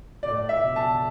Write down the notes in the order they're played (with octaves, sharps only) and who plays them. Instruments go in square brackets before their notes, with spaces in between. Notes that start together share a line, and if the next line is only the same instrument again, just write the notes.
[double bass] A2 [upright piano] D5
[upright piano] E5
[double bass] B2
[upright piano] A5